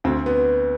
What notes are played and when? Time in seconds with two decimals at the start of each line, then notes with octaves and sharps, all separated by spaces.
0.04 D2 C4
0.26 B3